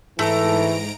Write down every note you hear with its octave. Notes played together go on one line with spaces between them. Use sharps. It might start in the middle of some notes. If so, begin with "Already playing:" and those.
G#2 E3 A3 A4 A#5 D7